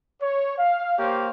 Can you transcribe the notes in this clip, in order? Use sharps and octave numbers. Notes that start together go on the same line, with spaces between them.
C#5
F5
A#3 G4 C5 C#5 F5